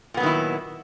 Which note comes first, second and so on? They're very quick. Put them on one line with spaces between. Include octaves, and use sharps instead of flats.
A#2 B3 F#3 D#3 E4